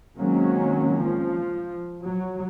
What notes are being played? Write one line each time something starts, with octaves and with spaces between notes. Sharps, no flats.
D#3 F#3 G#3 A#3 C4 C#4
F3
F#3